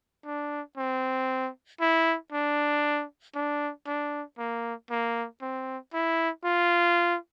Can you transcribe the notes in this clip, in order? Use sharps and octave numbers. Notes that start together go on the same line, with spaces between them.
D4
C4
E4
D4
D4
D4
A#3
A#3
C4
E4
F4